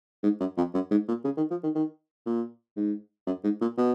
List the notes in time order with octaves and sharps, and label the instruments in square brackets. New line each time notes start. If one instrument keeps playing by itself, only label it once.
[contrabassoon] G#2
F#2
F2
F#2
G#2
A#2
C#3
D#3
F3
D#3
D#3
A#2
G#2
F#2
G#2
A#2
B2